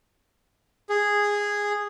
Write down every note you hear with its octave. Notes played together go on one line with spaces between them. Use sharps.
G#4